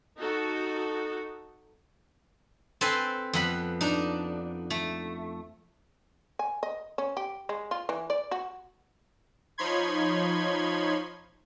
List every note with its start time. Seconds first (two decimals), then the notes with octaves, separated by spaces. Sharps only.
0.18 D#4 F#4 A4
2.81 C4 A4 B4 G#5 C6
3.33 F2 B3 B5
3.81 D4 D#4
4.70 A3
6.39 G#5
6.63 D#5
6.98 C#4
7.17 G4
7.49 G#3
7.71 F4
7.89 E3
8.10 D5
8.31 F#4
9.58 F3 D#4 C#5 B5 C6 G#6